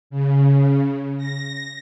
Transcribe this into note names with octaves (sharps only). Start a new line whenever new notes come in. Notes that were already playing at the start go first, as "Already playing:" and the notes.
C#3
A#6